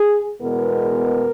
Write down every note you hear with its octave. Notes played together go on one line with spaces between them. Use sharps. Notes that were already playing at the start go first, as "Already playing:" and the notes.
Already playing: G#4
E2 B2 G#3 B3 A#4